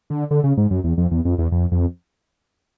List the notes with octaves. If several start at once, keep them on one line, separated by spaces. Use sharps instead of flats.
D3
D3
C#3
G#2
F#2
E2
F2
E2
F2
E2
F2
F2